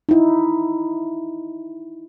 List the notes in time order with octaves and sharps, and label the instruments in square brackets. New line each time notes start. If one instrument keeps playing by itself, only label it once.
[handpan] D#4 E4